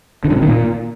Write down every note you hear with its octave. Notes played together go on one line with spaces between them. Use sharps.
D3
G2
C3
D#3
A#2